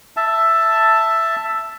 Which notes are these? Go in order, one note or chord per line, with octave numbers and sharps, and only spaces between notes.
E5 A5